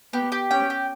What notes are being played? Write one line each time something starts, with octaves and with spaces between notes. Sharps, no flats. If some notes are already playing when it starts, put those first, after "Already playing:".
B3 G4
G4
C#4 G5
G4